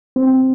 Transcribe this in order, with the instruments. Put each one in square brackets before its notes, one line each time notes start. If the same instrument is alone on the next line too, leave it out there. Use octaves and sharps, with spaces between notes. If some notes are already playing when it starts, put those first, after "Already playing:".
[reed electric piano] C4